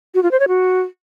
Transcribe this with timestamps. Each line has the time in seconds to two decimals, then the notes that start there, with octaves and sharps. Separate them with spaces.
0.14 F#4
0.23 F4
0.31 C5
0.40 C#5
0.48 F#4